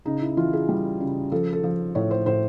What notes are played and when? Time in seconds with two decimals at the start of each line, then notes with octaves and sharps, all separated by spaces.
0.05 C#3 D#4
0.21 E4
0.37 E3 F4
0.53 G#4
0.69 G3
1.01 C#3
1.32 F3 A4
1.53 A4
1.64 F3
1.95 A2 C#5
2.11 C5
2.26 A2 C5